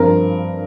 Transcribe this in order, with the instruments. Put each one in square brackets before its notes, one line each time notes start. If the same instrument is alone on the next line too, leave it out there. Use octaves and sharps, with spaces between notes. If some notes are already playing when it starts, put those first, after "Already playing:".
Already playing: [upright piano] G2 F3 C4 A#4